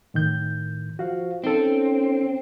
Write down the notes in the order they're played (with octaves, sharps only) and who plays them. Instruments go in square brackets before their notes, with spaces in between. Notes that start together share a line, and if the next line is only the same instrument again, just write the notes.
[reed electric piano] A2 D#3 G6
[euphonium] F3 [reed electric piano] F#4 F5
[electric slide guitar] C4 [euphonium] C#4 [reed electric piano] D#4 A4